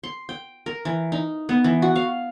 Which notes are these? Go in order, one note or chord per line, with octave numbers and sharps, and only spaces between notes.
C6
G5
A#4
E3
D#4
B3
E3
F#4
F5